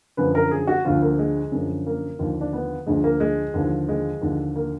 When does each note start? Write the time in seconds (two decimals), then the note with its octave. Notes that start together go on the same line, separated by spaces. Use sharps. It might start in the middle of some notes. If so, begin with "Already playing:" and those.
0.17 F#2 D3 F3 B4
0.35 A#4
0.51 G#4
0.67 F#4
0.85 D2 D3 F3 F4
1.02 A#3
1.19 G#3
1.52 F#2 D3 F3
1.86 A#3
2.19 D#2 D3 F3
2.41 D4
2.53 B3
2.87 D2 D3 F3 G#3
3.04 A#3
3.20 G#3
3.54 D#2 D3 F3
3.89 G#3
4.21 D#2 D3 F3
4.56 A#3